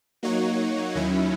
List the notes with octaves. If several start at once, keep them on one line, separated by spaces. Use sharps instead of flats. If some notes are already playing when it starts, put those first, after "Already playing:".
F#3 A#3 D#4 F#4 C#5
D#2 D#3 F#3 C#4 E4